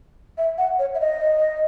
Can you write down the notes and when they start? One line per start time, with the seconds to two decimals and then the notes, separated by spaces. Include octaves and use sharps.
0.38 E5
0.58 F#5
0.79 C#5
0.95 E5
1.00 D#5